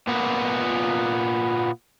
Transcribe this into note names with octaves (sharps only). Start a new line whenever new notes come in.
A#2 B3